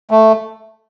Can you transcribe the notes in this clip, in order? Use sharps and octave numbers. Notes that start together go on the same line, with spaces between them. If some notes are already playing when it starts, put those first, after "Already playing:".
A3